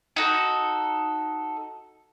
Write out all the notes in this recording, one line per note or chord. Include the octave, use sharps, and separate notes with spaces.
D#4 F#4 A4